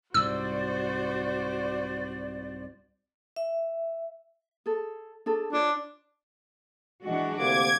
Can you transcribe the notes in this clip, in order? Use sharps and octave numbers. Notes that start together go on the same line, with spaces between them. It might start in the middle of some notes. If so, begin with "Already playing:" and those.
C2 G#2 F#4 C5 D5 E6
E5
G#4 A4
D4 G#4 A4
D4 F4 C#5
E3 G#3 D4 F#4
D2 C3 A#3 D6 G#6